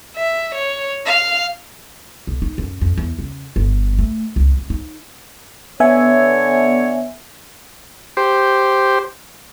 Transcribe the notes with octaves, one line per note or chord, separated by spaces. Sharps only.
E5
C#5
F5
B1
D#4
F#2
F2
E2
C#3
G1
A3
C#2
C#2
D#4
D3 B3 C#5 E5 G#5
G4 C5